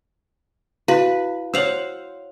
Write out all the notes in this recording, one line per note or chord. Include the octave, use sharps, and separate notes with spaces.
E4 F#4 B4 F5
C5 C#5 F5 F#5 E6